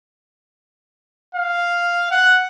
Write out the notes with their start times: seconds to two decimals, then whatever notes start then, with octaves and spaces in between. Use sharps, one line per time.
1.35 F5
2.11 F#5